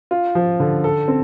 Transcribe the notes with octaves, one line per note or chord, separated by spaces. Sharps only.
F4
F3
D3
A4
C4